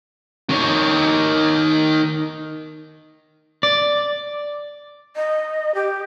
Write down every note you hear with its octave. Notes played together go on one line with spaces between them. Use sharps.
D#3 C#5
D5
D#5
G4